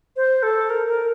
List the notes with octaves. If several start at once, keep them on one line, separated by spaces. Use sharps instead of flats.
C5
A4
A#4
A#4